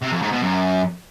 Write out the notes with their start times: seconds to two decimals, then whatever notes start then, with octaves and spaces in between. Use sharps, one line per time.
0.03 C3
0.12 F2
0.22 G#2
0.32 B2
0.42 F#2